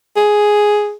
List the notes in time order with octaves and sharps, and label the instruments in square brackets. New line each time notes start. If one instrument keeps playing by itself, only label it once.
[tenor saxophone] G#4